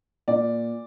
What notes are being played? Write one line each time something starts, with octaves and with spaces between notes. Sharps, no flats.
A#2 D5